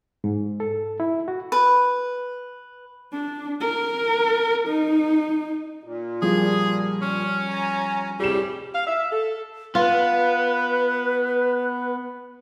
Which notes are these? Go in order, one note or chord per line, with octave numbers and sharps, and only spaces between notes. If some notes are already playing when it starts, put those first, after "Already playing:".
G#2
A4
E4
F#4
B4
D4
A#4
D#4
A#2
F3 G3 F4 G#4
C#4
G#5 A#5
F2 A2 C3 G3 G#4 E7
F5
E5
A4
B3 F4 B4